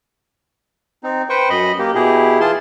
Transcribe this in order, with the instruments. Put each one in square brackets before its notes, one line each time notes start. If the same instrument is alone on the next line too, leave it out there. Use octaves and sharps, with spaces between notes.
[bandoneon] C4 D#4
B4 C5 G5 C#6
F#2 D#5 B5
A#3 G4
B2 E4 G4 G#4
E3 F4 G#4 A5 C6